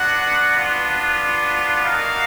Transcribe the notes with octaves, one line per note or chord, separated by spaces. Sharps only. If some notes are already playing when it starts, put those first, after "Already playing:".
Already playing: B3 D4 F#4 F#5
B3 D4 F4
A#3 D#4 F#4 F5